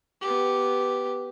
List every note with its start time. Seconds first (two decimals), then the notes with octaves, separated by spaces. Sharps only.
0.21 B3 G4